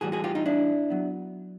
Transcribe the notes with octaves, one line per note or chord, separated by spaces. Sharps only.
A2 E3 G3 F#4 G#4
F#4 G#4
F4 G4
D#4 F4
D4 E4
F#3 B3